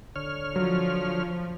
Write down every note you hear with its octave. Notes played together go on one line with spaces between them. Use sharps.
D3 C#5 F6
F3 F#3